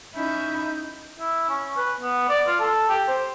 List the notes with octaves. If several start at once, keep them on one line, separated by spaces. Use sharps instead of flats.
C#4 D#4 E4 G6
E4
C#4
B4
B3
D5
F4
A4
G4
C5